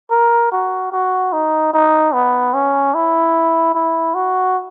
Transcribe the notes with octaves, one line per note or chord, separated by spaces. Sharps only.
A#4
F#4
F#4
D#4
D#4
B3
C#4
E4
E4
F#4